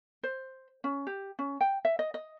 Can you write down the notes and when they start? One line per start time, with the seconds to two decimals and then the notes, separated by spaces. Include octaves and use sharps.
0.23 C5
0.84 C#4
1.07 G4
1.39 C#4
1.61 G5
1.85 E5
1.99 D#5
2.14 D#5